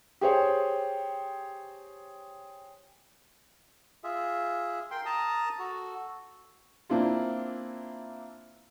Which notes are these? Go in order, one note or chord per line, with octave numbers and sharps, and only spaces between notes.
G4 G#4 C5 C#5
F4 G#4 E5
A#4 G5 C6
A5 A#5 D#6
F#4 A4
A#3 C4 D4 E4 F4